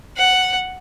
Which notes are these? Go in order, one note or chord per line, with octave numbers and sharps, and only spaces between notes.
F#5